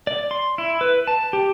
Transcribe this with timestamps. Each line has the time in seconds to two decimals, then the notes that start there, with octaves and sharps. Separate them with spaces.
0.07 D5
0.31 C6
0.58 E4
0.81 B4
1.07 A5
1.33 G4